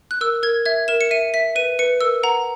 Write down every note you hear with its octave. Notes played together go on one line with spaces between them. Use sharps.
F#6
A#4 E6
A#4 G#6
E5 G#6
A#4 E7
C#7
E5 D#7
E5 B6
B4 D#7
B4 C#7
A#4 E6
F#5 A#5